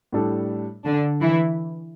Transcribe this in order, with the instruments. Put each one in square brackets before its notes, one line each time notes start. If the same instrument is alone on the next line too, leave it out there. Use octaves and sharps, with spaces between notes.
[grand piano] A2 G3 D4 A4
[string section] D3 D4
E3 E4